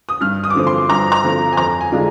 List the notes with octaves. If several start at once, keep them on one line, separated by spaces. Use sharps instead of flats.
D#6
G2 F6
D#6
D6
D3 F3 C4 D#6
C6
G2 A#5
A#5
D3 F3 C4
G#5
F2 A#5
G#5
D3 G#3 D4 F4